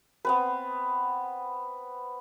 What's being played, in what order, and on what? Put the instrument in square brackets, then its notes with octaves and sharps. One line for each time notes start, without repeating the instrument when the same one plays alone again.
[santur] B3 C4 B4